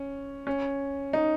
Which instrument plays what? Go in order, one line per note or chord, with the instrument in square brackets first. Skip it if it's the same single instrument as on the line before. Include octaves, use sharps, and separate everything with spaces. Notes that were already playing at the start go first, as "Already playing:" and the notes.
Already playing: [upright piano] C#4
C#4
D#4